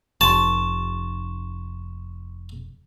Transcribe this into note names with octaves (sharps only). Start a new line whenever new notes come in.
F1 A5 C6 C#6